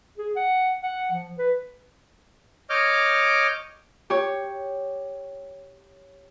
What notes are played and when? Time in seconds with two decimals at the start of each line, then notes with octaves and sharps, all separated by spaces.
0.18 G#4
0.36 F#5
0.83 F#5
1.12 F3
1.39 B4
2.70 C#5 D#5 D6 F6 G6
4.10 G4 C#5